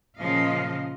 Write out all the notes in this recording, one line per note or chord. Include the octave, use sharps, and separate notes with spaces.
A#2 C#3 F3 D#5 F5